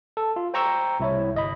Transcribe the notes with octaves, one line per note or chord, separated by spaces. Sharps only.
A4
F4
C5 G5 A#5 C#6 E6 G6
C2 E4 C#5
G1 D#5 B5